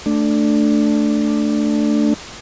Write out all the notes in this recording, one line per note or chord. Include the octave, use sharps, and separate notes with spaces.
A3 D4